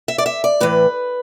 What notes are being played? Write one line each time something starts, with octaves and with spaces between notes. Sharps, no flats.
E5
D5
E5
D5
A2 E3 B4